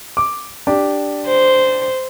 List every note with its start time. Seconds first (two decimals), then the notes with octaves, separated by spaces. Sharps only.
0.17 D6
0.67 D4 G4 D5
1.26 C5